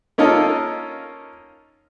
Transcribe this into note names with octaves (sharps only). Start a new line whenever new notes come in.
A#3 C#4 D#4 F4 A4 A#4